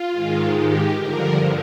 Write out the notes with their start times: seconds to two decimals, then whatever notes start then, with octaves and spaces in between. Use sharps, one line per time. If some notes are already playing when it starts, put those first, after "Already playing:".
Already playing: F4
0.11 G#2 D#3 G#3
0.53 G4
0.95 G2 D3 F3 A#4